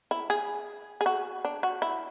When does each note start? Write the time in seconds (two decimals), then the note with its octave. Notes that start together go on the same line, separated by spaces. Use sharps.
0.11 E4
0.30 G#4
1.01 G#4
1.06 F#4
1.45 D4
1.63 F#4
1.82 E4